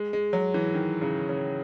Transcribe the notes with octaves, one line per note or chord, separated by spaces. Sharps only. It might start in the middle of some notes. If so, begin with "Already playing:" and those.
Already playing: G#3
G#3
F#3
E3
D#3
C#3
C#3